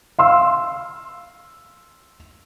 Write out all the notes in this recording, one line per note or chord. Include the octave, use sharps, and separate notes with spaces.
F5 C6 E6